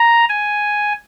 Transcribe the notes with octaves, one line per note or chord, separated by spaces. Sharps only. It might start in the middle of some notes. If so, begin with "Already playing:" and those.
Already playing: A#5
G#5